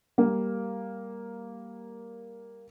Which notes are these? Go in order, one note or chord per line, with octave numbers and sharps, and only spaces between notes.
G3 A#3 A#4